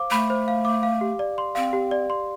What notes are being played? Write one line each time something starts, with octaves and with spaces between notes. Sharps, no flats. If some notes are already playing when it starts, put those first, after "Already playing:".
Already playing: C5 F5 D6
A3 B5
C5
F5
D6
F5
G4
D5
C6
C4 F5
G4
D5
C6